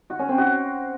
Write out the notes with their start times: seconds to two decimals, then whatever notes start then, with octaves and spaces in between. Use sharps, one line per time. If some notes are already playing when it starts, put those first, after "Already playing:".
0.10 F#4
0.19 C#4
0.29 C4
0.38 F#4